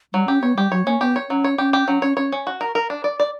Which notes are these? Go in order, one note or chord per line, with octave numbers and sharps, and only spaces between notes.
F#3 G3
C#4 G4
B3 C#5
G3 G4
F#3 C#5
A#3 C#4
B3 G4
C#5
F#3 C#4
C#5
C#4 G4
G4
F#3 C#4
C#4 C#5
C#4 C#5
C#4
F#4
A#4
A#4
D4
D5
D5